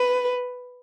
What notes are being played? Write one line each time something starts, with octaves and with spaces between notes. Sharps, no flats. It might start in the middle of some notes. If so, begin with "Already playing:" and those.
Already playing: B4